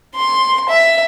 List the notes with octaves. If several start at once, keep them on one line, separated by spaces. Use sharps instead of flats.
C6
E5